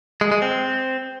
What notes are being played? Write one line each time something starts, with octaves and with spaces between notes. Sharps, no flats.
G#3
G#3
C4